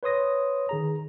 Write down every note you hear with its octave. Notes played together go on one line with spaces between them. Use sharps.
B4 C#5 C6 D#6 A#6
D#3 G#4 A#5